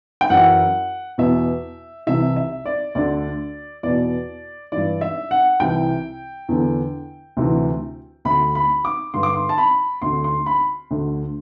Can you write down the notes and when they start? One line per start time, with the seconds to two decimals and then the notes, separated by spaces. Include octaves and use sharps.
0.21 G5
0.30 F#2 E3 F#5
1.18 E2 B2 E5
2.07 C2 C3 E3 E5
2.36 E5
2.66 D5
2.95 D2 D3 D5
3.83 E2 B2 D5
4.72 G2 E3 D5
5.01 E5
5.31 F#5
5.60 C2 C3 E3 G5
6.49 E2 D3
7.37 D2 C3 E3
8.25 D2 D3 B5
8.55 B5
8.85 D6
9.14 G2 D3 C6
9.23 D6
9.33 C6
9.49 A5
9.58 B5
10.02 D2 D3 C6
10.24 C6
10.46 B5
10.91 D2 D3